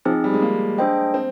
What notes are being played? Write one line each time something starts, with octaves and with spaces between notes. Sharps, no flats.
F3 C4 D#4 G#4
G3
G#3
A#3
D4 G#4 C5 D#5 G5
C4